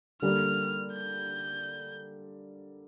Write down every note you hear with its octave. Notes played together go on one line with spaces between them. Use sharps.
D3 G3 A#3 F6
G6